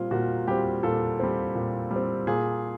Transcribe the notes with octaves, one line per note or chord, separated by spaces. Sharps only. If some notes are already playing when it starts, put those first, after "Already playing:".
Already playing: A#2 G3 C4 F4
A#2 F#4
G3 C4 G4
A#2 A4
G3 C4
A#2
G3 C4
A#2 G#4